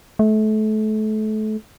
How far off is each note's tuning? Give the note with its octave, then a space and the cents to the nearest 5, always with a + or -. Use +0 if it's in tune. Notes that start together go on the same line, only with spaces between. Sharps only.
A3 -30